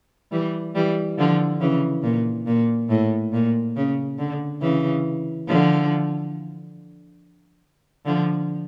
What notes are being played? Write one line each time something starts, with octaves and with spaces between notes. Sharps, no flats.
E3 G3
E3 G3
D3 F3
C#3 E3
A#2
A#2
A2
A#2
C#3
D3
C#3 E3
D3 F3
D3 F3